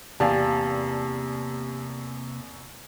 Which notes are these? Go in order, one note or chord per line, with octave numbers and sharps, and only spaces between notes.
E2 C3 A#3 G4 D5 F5 G#5 A5